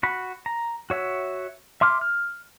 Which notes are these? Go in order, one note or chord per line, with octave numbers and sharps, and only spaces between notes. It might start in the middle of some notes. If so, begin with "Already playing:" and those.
F#4 B5
A#5
F#4 C#5 E5
E5 C6 D6 F6
F6